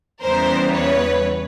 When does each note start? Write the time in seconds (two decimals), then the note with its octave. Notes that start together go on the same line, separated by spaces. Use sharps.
0.22 E2 C#3 E3 G3 B3 A#4 C5
0.72 B4 C#5